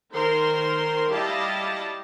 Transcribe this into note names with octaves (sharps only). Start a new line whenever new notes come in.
D#3 A#4 C5 C6
G3 E4 G4 D#5 F5 A5